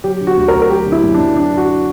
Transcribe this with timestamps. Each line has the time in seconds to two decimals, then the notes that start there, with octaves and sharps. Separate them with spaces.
0.04 F#3 G4
0.21 D3
0.27 F#4
0.37 D2
0.48 A#4
0.54 D2
0.62 A#4
0.70 F#3 G4
0.86 D3
0.92 E4
1.03 F#2
1.14 D4
1.19 F#2
1.36 F#3 D4
1.53 D3 F#4